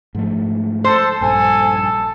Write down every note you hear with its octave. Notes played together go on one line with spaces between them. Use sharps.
G#2 F3 A3
A4 C5
A#1 G2 A4 G#5